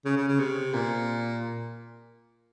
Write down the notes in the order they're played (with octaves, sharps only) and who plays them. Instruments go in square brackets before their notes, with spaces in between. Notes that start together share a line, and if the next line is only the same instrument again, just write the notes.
[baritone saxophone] C#3
C#3
C#3
C3
A#2